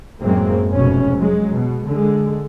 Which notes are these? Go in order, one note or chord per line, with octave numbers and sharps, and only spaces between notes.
F#2 A2 G#3 A#3 C4
F1 G#2 B2 C#4
F#3 G#3
B2
D3 G#3